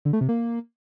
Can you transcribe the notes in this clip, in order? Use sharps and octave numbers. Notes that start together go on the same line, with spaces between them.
D3
A3
C3
A#3